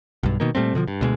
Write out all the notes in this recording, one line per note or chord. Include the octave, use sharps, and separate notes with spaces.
B1 G2
B2 D#3 A#3
A#2 G3 A3 C4
B2 D3 D#3 F3
G2
D2 B2 G#3